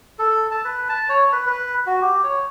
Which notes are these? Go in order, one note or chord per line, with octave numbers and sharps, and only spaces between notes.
A4
A5
B4
A5
C#5
B4
B4
F#4
G4
C#5